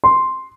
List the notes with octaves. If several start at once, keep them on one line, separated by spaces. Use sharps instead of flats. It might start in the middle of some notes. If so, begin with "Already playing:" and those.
C6